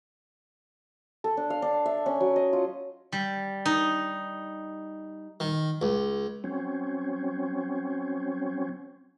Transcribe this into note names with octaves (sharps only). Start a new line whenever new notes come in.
A4
D4
F5
D4
E5
C#4
F#3
D#5
F4
G3
D#4
D#3
C#2
F#3 C4 C#4